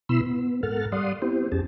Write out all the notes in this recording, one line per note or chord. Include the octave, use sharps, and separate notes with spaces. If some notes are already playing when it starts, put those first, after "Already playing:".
B2 B3 E4 B5 C6 E6
B3
G#2 A4 A#4 F#5 F6 A6
G3 D5 F5 F#5 C6 D#6
B3 C4 E4 G4 C5
F2 C#4 G4 G#4 A5